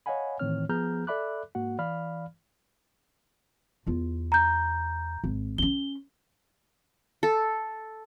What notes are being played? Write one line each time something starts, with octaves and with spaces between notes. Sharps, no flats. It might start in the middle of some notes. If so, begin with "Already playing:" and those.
C#5 D#5 F5 F#5 G#5 B5
A2 D#3 E3 C4 C#5 F6
F3 B3 G#4 A#5 F6 G6
A4 D5 E5 B5 D6 F#6
G#2 A#3 F#4 F#5
E3 D5 F5 B5 F6
E2 F4
A#5 G6
G#1
C4 C#4 G7
A4